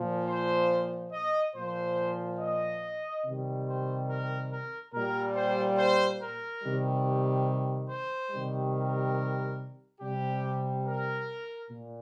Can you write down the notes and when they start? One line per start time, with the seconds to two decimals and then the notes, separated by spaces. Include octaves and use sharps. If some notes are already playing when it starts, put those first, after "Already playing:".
Already playing: A#2 F3
0.28 C5
1.12 D#5
1.54 A#2 F3 C5
2.39 D#5
3.24 C3 D#3 G3
3.66 C5
4.09 A#4
4.51 A#4
4.93 A#2 G3 A#4
5.35 C5
5.78 C5
6.20 A#4
6.62 C3 D#3 G3
7.90 C5
8.31 C3 D#3 G3
8.74 A#4
10.01 C3 G3 G4
10.85 A#4
11.70 A#2